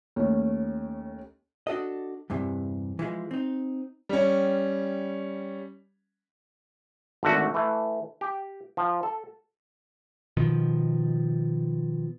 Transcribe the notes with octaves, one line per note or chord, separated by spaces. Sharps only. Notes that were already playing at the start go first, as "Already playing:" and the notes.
D#2 A3 C#4
D4 F#4 A4 D#5
E2 G2 C3 E3
E3 F3 G#3
C4 D#4
G3 C#4
G#1 D3 A3 F#4
E3 A3
G4
F3
A4
B2 D#3 F3